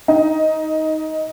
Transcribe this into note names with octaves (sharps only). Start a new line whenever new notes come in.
D#4